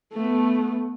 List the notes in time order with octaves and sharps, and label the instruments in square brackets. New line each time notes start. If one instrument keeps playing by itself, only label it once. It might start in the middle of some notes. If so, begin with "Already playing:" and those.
[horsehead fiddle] A3 B3